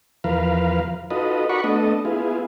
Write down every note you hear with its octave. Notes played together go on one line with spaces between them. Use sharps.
E2 F3 A#4 B4 F5
D#4 F4 F#4 A4 B4 D#5
F#4 A#4 D5 F#5 B5 C#6
A3 B3 D4 A4 D#5
B3 E4 F4 G#4